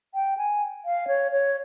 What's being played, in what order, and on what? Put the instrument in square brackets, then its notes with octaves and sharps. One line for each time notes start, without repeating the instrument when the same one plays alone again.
[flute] G5
G#5
F5
C#5
C#5